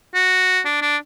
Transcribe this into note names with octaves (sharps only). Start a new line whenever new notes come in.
F#4
D4
D4